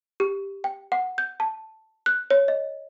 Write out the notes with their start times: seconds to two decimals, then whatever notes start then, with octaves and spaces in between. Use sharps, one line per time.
0.20 G4
0.64 G5
0.92 F#5
1.18 G6
1.40 A5
2.06 F#6
2.30 C#5
2.48 D#5